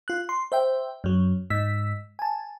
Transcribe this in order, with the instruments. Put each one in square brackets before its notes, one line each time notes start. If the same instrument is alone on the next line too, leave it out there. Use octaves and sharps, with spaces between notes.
[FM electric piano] F4 F#6
C6
C5 E5 G5
F#2 F#3
G#2 E6 B6
G#5 A5